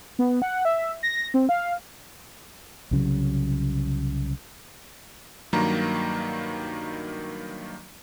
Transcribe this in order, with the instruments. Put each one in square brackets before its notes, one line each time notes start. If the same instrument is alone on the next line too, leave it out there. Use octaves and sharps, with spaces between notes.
[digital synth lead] B3
F#5
E5
A#6
C4
F5
[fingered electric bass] C2 C#3 F#3
[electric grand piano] G2 D#3 F#3 A#3 A#5